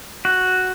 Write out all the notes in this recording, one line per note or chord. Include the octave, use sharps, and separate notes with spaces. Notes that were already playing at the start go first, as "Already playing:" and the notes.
F#4